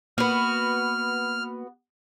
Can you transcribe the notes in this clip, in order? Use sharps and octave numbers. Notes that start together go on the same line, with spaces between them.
A#3 B3 F#4 F6